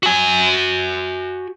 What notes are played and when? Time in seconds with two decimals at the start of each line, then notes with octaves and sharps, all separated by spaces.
0.03 F#4 G#5